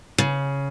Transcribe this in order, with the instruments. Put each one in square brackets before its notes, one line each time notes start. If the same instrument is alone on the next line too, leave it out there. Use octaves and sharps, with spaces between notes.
[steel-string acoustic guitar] C#3